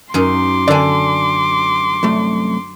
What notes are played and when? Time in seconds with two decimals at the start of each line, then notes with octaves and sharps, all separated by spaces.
0.14 F#2 D#4 C6 D6
0.68 D3 D4 D5 G#5
2.03 C2 F#2 A3